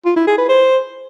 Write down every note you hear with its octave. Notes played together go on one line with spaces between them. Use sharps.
F4
E4
G#4
B4
C5